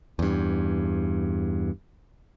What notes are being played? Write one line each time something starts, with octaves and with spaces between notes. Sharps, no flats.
E2 G2